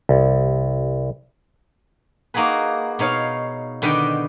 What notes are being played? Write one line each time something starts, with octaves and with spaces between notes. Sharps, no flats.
C2
A#3 D#4 F#4 G#4 B4
B2 D#4 C#5 F5
B2 D3 D#3 B4 D#5 G5